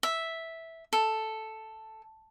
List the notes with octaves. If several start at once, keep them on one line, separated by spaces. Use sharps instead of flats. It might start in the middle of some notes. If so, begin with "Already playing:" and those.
E5
A4